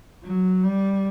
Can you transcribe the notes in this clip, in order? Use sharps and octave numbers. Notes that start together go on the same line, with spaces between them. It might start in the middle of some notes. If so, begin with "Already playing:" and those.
F#3
G3